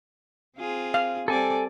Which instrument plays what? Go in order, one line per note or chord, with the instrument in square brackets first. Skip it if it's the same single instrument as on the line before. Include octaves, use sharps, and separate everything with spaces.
[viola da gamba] C4 F4 G#4
[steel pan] F5
[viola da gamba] G3 C4 D5 [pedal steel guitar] A4 G#5